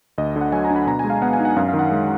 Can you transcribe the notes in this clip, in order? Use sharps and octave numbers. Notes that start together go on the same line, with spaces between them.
D2 D#5
D3
F#5
F#3 G#5
A#5
D4
B5
B2 A#5
G#5
G#3
F5
B3 F#5
G#5
D#4
F#5
F#2 F5
F5
D#3
F#5
G#3